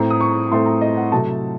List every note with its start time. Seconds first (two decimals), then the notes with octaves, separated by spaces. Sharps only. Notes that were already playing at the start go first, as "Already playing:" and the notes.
Already playing: A2 A3 C4 A#5
0.10 D#6
0.21 C#6
0.51 A2 A3 C4 C6
0.66 A#5
0.81 D#5
0.97 F#5
1.12 C3 F#3 A3 A5